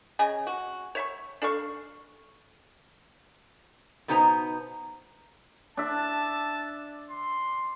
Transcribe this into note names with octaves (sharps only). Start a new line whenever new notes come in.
C#3 D#5 G#5
F#4
C#5 E5 C#6
D4 A4 F5 C#6
B2 B3 D#4 C5 G5 A#5
D4 E5 A5
C6